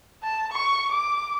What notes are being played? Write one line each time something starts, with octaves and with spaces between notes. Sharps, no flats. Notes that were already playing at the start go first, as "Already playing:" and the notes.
A5
C#6
D6